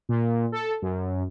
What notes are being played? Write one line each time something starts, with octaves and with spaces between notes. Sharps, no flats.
A#2
A4
F#2